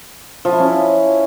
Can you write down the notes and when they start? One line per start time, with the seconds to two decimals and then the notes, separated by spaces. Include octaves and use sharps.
0.45 F3
0.52 E4
0.60 C#4